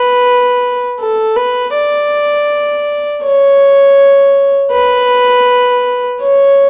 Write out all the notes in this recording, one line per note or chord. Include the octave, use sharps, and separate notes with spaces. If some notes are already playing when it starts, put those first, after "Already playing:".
Already playing: B4
A4
B4
D5
C#5
B4
C#5